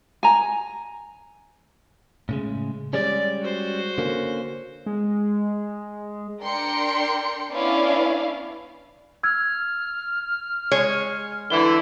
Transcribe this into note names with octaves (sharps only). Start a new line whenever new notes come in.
G#5 A#5
A2 C#3 G#3
G3 G#3 C#4 D5
F#4 C5
D3 A#3 C#4
G#3
D4 A#4 G5 C6 C#7
B3 C#4 D4 E4 D5 F5
E6 F6 G#6
G#3 C#5
D3 E3 E4 G7